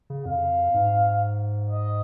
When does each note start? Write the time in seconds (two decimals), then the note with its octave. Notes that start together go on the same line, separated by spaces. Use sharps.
0.10 C#3
0.25 F2 F5
0.74 G#2
1.70 D#5